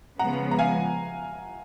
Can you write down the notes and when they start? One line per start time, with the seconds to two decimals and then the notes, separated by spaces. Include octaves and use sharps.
0.19 C#3 F3 G#3 B3 F#5 A#5
0.51 A#5
0.59 F5 G#5